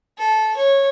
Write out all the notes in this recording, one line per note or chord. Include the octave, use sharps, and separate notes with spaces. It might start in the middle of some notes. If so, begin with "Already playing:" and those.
A4
C#5